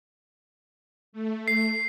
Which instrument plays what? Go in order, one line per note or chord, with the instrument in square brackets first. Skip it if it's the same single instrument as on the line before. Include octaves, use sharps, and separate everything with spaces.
[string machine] A3
[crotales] C7